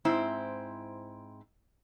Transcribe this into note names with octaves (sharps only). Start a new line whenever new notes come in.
G#2 C4 E4